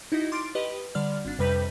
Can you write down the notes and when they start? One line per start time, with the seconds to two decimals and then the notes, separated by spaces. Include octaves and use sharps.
0.12 D#4 E4 F#4 D#5
0.32 C6 D6 F6 A6 D7
0.55 G4 B4 D#5
0.95 D3 G3 D5 F6
1.25 G#1 D4
1.39 F2 C3 G3 B4 G6 B6